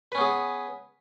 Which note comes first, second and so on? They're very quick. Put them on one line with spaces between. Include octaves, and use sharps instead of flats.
B4 C#4 B3 G#4